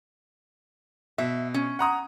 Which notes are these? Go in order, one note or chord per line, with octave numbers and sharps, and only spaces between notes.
B2 E5
C#4
F#5 A#5 D#6